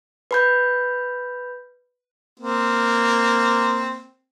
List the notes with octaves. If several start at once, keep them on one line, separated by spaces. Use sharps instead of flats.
B4 B5 G6
A#3 C4